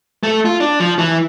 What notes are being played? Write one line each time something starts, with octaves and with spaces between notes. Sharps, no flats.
A3
F4
D4
F3
E3